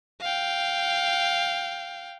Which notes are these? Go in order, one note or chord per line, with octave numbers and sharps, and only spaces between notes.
F5 G5